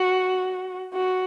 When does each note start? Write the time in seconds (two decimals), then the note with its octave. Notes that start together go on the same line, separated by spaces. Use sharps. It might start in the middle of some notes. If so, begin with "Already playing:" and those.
Already playing: F#4
0.94 F#4